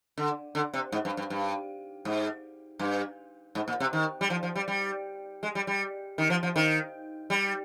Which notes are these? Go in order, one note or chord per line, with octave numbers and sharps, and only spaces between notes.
D3
D3
C3
G#2
G2
G2
G2
G#2
G2
G#2
A#2
C3
D#3
G3
F3
F3
G3
G3
G#3
G3
G3
D#3
F3
F3
D#3
G3